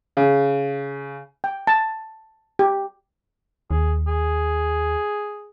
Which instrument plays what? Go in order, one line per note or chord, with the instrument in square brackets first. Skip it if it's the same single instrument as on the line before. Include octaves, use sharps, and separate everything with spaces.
[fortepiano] C#3
[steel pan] G5
A5
G4
[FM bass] D#2 [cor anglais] G#4
[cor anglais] G#4